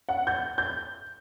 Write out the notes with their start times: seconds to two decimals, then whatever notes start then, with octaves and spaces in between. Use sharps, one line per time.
0.09 F#5
0.27 G6
0.58 G6